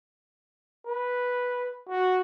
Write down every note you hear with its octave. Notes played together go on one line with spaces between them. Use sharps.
B4
F#4